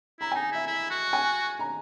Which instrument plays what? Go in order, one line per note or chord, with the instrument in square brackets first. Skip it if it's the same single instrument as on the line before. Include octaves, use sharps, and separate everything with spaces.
[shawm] E4 [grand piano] A#5
[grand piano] G#5
[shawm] D#4
[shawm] E4 [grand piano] E5
[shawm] E4
F#4
[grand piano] G#5
A#5